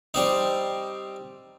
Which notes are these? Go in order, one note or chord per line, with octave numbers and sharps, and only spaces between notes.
G3 C4 D#4